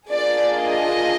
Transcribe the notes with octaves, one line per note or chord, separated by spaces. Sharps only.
A#3 D4 F4 G#4 D5
D#5